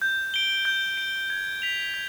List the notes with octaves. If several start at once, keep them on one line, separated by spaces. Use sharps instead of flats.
G6
D7 G7
G6
D7 G7
G#6
B6 F7
G#6